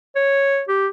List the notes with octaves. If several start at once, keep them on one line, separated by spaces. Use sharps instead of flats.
C#5
G4